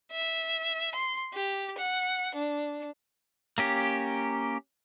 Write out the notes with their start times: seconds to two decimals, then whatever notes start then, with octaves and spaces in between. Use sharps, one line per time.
0.12 E5
0.95 C6
1.34 G4
1.78 F#5
2.35 D4
3.58 A#3 C#4 G4